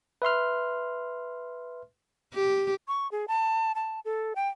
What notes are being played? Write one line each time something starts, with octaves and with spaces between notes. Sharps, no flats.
B4 E5 C6 F6
G4
C#6
G#4
A5
A5
A4
G5